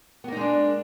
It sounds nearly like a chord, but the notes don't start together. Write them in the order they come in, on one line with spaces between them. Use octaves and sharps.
B3 A#3 D#4 G#3 D4